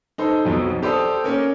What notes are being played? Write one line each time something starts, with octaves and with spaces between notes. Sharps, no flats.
D#4 A4 C5
B1 F2 B2 F3
G4 A4 C5 D5 D6 D#6
A#3 C#4 A#4